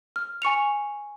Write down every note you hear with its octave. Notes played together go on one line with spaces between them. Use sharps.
F6
G#5 C#6 C#7 F7